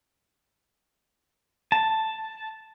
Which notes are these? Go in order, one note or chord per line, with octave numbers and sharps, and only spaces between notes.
A5